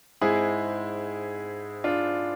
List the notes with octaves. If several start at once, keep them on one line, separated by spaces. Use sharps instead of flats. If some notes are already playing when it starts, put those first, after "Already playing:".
G#2 G#3 C4 E4 G#4
D4 F4